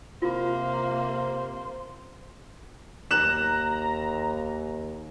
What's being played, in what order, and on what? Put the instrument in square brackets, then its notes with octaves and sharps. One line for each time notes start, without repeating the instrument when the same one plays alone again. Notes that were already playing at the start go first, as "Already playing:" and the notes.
[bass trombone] C3 [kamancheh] A#3 [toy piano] F4 [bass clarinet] C5
[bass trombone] D#2 [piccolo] A#5 [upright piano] F#6 E7